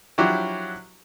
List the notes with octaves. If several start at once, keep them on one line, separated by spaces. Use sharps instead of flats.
F3 F#3 D4 E4 F#4 G4